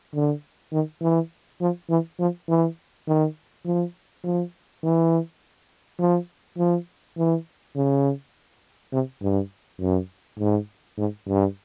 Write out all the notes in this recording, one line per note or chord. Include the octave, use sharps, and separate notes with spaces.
D3
D#3
E3
F3
E3
F3
E3
D#3
F3
F3
E3
F3
F3
E3
C#3
C3
G2
F#2
G#2
G#2
G2